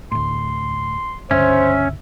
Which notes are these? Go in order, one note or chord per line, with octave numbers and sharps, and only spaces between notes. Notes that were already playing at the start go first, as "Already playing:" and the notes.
D2 A2 C6
C#2 G2 D3 C#4 C5 E5